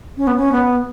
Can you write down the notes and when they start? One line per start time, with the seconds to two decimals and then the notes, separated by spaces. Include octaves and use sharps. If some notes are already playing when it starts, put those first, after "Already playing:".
0.17 C#4
0.27 B3
0.35 C#4
0.51 B3